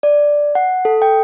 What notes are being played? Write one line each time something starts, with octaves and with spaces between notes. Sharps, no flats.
D5
F#5
A4
G5